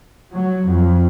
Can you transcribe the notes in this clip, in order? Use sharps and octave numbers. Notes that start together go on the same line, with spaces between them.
F#3
F2